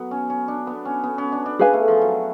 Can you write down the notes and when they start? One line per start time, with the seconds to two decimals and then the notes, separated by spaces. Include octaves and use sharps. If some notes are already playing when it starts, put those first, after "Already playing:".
Already playing: F#3 B3
0.11 C#4
0.30 C#4
0.48 D4
0.67 B3
0.85 C#4
1.04 B3
1.18 C#4
1.32 D4
1.46 D4
1.59 C#4 G#4 B4 F5 G#5
1.73 A3
1.88 F3
2.02 F#3